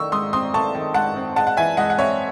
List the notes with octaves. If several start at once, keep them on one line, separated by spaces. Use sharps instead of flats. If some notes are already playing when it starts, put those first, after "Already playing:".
Already playing: D#3 A3 C#6 E6
G#2 C6 D#6
C4 C6 D#6
A3 A5 C#6
D#3
G#2 F#5 A5
C4
G#3 F#5 A5
F#5
E3 E5 G#5
G#2 D#5 F#5
F#5
C4 C#5 E5